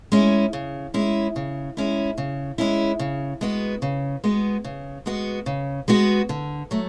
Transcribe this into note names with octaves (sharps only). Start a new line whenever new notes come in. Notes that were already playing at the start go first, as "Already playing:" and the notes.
G#3 C#4 E4
C#3
G#3 C#4 E4
C#3
G#3 C#4 E4
C#3
G#3 C#4 E4
C#3
G#3 B3 F#4
C#3
G#3 B3 F#4
C#3
G#3 B3 F#4
C#3
G#3 B3 F#4
D3
F#3 A3